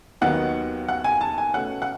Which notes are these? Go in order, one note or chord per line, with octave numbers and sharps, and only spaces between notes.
D#2 D#3 F#3 B3 D#4 F#5
F#5
G#5
A5
G#5
B2 A3 C#4 F#5
F#5